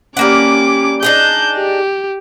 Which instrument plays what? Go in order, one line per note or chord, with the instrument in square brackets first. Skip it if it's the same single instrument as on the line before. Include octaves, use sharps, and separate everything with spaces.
[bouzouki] G3 A#3 F#5 [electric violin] C#4 D6
[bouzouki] D4 D#4 G#4 [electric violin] G6
[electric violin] G4